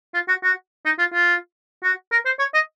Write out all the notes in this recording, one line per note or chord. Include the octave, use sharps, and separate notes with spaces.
F4
F#4
F#4
D#4
F4
F4
F#4
A#4
C5
C#5
D#5